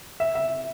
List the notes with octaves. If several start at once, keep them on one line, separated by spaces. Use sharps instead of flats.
E5
E5